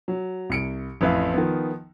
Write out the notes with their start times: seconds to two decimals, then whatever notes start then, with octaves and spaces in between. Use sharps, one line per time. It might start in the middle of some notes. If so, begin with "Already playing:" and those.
0.08 F#3
0.50 C2 C#7 D7
1.01 A1 F2 B4 E5 F5
1.34 D#3 F3 B3